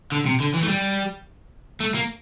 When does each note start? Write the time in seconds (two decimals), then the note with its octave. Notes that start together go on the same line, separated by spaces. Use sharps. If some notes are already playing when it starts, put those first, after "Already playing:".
0.12 D3
0.26 C3
0.40 D3
0.54 E3
0.63 A3
0.68 G3
1.80 A3
1.95 A#3